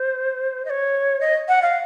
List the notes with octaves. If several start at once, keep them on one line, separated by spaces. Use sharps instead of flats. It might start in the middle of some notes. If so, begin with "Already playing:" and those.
Already playing: C5
D#5
C#5
D#5
F#5
F5